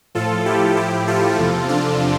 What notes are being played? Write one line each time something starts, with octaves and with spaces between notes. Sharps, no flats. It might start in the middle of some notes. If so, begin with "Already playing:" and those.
A2 F3 F4 A4
E4 G4
A2 F3 E4 G4
F4 A4
E2 C3 F3
D4 F4